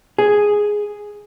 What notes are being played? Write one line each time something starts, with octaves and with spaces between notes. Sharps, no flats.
G#4